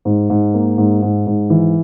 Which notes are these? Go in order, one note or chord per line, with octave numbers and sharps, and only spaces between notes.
G#2
G#2
A#3
G#2
G#2
G#2
E3